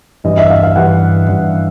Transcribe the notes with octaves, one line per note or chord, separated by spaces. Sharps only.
G2 E3 D#5
E5
F5
F5
G2 E3 F#5
G2 E3